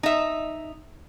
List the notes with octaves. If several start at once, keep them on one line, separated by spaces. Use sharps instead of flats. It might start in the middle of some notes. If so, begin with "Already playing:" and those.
D#4 E5